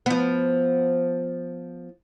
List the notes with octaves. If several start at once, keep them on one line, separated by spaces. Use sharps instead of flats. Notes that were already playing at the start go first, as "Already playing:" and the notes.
F3 B3